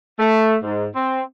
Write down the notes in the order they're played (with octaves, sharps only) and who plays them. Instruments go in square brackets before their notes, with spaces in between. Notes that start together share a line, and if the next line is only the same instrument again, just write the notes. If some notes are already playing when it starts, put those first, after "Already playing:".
[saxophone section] A3
G#2
C4